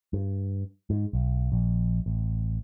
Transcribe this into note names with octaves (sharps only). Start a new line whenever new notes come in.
G2
G#2
B1
A#1
A1